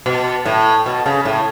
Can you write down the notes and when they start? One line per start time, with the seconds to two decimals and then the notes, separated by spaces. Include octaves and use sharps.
0.06 B2
0.46 A2
0.86 B2
1.06 C#3
1.25 A2